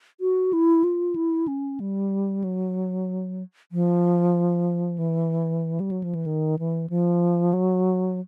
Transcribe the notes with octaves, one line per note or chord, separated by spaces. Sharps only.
F#4
E4
F4
E4
C#4
G3
F#3
F3
E3
G3
F#3
F3
E3
D#3
E3
F3
F#3